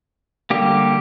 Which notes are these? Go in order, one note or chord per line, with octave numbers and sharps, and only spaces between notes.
D3 G3 A#3 G4